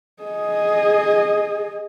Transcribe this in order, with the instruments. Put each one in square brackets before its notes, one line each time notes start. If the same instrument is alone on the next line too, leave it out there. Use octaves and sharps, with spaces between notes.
[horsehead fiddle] G#4 D#5